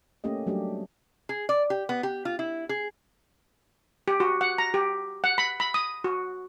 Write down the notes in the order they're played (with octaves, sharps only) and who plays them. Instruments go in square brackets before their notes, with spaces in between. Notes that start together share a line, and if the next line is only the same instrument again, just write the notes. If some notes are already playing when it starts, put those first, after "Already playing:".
[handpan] A3 A#3 C#4 G4 D#5
F#3 G3 A3 D4 G4
[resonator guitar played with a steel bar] G#4
D5
G4
B3
G4
F4
E4
G#4
[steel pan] G4
F#4
F#5
A#5
G4
F#5
B5
B5
D#6
F#4